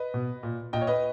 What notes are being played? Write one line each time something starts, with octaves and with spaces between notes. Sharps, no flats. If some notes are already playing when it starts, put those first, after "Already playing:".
Already playing: B4 D#5
B2
A#2
A#2 D#5 G5
C#5
B4 D#5